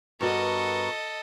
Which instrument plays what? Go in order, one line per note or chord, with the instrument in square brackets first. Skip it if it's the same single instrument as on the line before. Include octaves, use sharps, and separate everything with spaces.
[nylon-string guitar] G2 F#4 [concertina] B3 A#4 C#6 [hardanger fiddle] A4 D#5